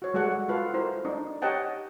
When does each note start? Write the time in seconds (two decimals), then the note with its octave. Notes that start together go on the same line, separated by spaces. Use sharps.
0.02 F#4 C#5
0.14 G3 G#3 F#4 A4 D5 F#5
0.49 F4 F#4 A4 B4 F5
0.74 E4 F#4 A#4 C5
1.05 D4 D#4
1.42 G4 C#5 D#5 F#5 G5 A5